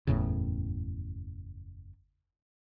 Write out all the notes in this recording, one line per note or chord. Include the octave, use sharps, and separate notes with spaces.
F#1 E2 A2 C#3